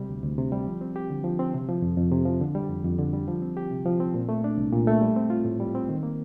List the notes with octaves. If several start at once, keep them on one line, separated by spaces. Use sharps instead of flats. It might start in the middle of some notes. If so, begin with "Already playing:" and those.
Already playing: C3 G3
D2
D2
C3
G3
F3
C4
G4
D3
F3
C4
C3
F3
F2
F2
C3
F3
D3
G3
F2
F2
D3
G3
F3
C4
G4
C3
F3
C4
A#2
A3
D4
C2
A#2
A3
G3
C4
F4
A2
G3
C4
D#3
A#3